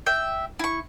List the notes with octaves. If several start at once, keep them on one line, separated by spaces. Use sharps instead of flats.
E5 G5
E4 C#6